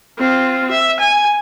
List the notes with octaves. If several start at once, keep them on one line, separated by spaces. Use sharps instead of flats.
C4 F4
E5
G#5